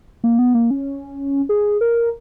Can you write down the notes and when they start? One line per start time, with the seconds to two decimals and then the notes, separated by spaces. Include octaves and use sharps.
0.24 A#3
0.39 B3
0.54 A#3
0.71 C#4
1.49 G#4
1.81 A#4